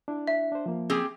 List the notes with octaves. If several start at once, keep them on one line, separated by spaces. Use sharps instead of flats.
D4 E4
E5
D4 C5
F3 A#3
C4 G4 G#4